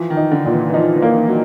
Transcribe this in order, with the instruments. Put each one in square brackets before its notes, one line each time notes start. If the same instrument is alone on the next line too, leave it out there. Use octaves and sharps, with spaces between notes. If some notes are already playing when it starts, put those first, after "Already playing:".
Already playing: [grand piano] E3 [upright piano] F3
[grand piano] D#3
[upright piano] D#4
[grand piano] D3
[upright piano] A#2
[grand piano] E3
E3
[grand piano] F3 [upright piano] D#4
[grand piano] E3
[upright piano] A#3
[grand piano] D#3
E3
F#3